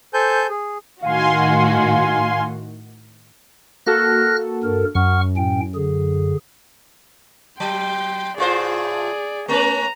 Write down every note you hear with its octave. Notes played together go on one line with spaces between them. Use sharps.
A4 C5 G#5 A5 G6
G#4
A2 D#3 F#4 F5 G#5 C6
A#3 F#4 A4 F6 F#6 A#6
G2 A#4
F#2 F#5 C#6 F6
A2 C#4 G5
D3 G#4
F#3 G5 C6
A2 F4 G#4 C5 D5
A3 C#4 B4 A#5